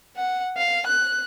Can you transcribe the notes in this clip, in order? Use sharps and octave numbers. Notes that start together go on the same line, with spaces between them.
F#5
F5
F#6